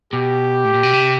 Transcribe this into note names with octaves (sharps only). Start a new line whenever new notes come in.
B2 G4
A2
A#2
B2
C3